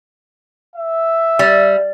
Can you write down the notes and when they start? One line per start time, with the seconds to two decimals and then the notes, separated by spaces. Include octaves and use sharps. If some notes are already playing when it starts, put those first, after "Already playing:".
0.76 E5
1.39 G3